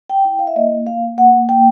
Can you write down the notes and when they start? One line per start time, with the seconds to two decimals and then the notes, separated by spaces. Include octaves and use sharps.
0.10 G5
0.25 E4 G5
0.39 F5
0.47 E5
0.56 A#3 D#5
0.87 A#3 F5
1.17 A#3 F#5
1.49 A#3 G5